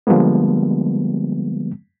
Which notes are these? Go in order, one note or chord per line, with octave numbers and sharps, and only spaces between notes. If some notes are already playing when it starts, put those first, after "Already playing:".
D3 F3 G3 G#3 A#3 B3